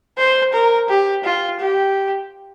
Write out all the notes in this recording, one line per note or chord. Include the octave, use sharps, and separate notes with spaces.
C5
A#4
G4
F4
G4